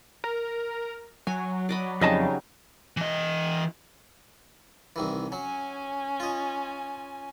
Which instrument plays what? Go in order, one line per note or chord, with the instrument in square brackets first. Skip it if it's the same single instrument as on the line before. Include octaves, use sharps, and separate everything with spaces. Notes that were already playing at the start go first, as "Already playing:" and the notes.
[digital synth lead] A#4
[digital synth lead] F#3 [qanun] C#5 G#5
[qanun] D5 D#5 B5
[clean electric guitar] F2 D#5 A5 [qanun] C#3 G3 D#4
[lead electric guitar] E3 D#5
[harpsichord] C2 D#3 E3
[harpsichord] F#3 [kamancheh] C#4 G#5
[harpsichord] F4 D#5